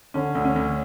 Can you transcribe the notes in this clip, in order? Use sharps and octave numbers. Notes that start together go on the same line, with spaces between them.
D3 C#4
D2
C#4
D2